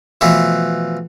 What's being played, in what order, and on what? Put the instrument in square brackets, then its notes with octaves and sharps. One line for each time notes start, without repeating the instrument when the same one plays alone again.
[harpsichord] B2 E3 F3 A3